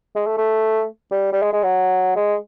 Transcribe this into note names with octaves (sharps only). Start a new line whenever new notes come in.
G#3
A3
A3
G3
G3
G#3
G#3
F#3
G#3